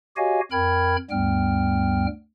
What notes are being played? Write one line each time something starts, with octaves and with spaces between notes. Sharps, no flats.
F#4 G4 C#5 D#5 F5 G#5
F2 A#4 G5 B5 F6 G#6
D2 G2 G3 B3 G5 F6